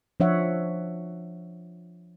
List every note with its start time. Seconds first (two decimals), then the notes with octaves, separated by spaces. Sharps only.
0.20 F3 D4 C#5 E5 F#5